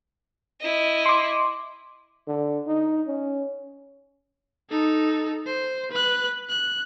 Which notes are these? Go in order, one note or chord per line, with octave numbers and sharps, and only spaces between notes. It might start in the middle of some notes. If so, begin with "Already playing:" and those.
E4 D#5
C6 D6
D3
D#4
C#4
D#4 A4
C5
B4 F#6
F#6